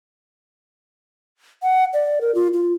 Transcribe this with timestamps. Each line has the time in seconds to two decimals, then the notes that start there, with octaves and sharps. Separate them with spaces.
1.63 F#5
1.93 D5
2.21 A#4
2.35 F4
2.54 F4